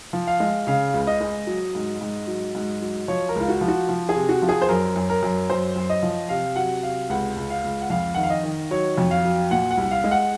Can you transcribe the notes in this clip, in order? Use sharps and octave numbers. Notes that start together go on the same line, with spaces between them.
F3
F5
G#3
C#3 F5
C#2
D#5
G#3
F#3
G#2
G#2
F#3
G#2
F#3
F3 C#5
A#4
C#2
F4
F#4
F3
F#4
F3
G#4
C3
F#4
F3
G#4
C5
F#2 A#4
F#2
A#4
F#2
F#2 C5
F#2
D#5
F3
C3 F5
F#3 F#5
C3 F5
C#2 F#5
C#2
F5
C#2
F#5
F2 F5
D#3 F#5
F5
D#5
D#3
F#3 C#5
F2
F5
F#3
A#2 F#5
F#5
C2
F5
G#3
F#5